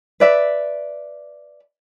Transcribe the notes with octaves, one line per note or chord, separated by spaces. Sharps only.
B4 D5 E5